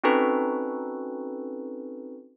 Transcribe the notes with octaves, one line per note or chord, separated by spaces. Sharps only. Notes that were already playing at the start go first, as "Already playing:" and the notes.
C4 C#4 D#4 F#4 A4 B4